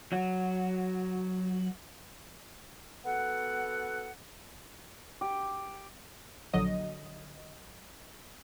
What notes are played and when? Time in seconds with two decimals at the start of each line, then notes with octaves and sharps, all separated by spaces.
0.12 F#3 F#4
3.05 B3 F#4 A4 F#5
5.21 G4
6.53 A#1 D3 F#3 D#5